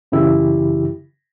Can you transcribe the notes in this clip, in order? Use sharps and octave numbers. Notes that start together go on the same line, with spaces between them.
F#2 C#3 E3 E4 G4